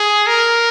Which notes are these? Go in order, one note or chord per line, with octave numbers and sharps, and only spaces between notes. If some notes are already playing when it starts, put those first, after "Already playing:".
Already playing: G#4
A#4